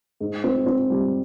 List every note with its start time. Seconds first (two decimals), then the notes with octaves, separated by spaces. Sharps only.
0.20 G#2
0.44 C4
0.66 C4
0.90 G3